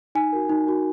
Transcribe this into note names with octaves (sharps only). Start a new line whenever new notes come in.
D#4 G#5
F#4 A#4
D#4
F#4 A#4